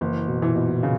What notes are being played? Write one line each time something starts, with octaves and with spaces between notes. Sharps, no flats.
F#1 E3
B2
E3
A#2
B2
C#3